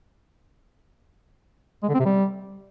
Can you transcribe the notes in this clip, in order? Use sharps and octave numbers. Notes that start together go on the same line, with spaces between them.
G#3
D3
C4
C3
G3